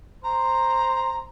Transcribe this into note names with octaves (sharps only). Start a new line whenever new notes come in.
C5 A#5